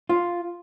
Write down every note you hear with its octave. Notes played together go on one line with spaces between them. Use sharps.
F4